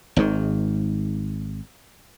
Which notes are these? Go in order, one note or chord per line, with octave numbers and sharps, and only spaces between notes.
G#1 G#2 D#3